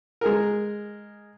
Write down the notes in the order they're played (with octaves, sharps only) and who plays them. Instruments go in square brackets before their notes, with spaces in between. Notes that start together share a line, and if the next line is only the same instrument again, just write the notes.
[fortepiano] G#3 G#4 A#4